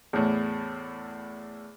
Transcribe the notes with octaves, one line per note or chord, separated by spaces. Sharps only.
E2 A2